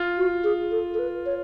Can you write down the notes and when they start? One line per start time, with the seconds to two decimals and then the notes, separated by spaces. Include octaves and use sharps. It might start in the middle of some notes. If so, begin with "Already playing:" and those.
Already playing: F4
0.17 F#4
0.44 G#4
0.71 A4
0.94 A4
0.99 B4
1.26 C#5